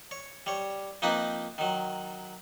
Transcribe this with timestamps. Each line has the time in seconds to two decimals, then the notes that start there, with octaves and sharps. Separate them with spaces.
0.11 C#5
0.46 G3 C#5
1.02 F3 A#3 C4 D#4 B4
1.58 D#3 F#3